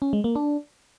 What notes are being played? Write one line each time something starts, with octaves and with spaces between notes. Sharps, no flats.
C#4
G#3
A#3
D4